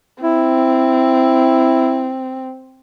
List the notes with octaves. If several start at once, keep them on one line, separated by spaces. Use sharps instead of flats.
C4 E4